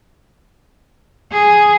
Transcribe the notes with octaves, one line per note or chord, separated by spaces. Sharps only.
G#4